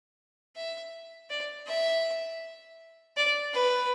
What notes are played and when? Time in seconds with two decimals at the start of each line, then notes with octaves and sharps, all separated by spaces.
0.56 E5
1.30 D5
1.67 E5
3.17 D5
3.54 B4